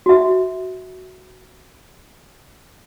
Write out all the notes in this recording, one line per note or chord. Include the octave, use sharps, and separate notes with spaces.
F#4 E5